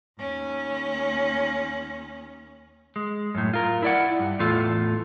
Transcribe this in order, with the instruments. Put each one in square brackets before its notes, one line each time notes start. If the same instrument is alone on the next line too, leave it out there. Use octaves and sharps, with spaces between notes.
[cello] D#2 C#4
[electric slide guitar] G#3
F#2 A2
F4 A#4
E4 D5 F#5
G2
E2 A2 F4 A4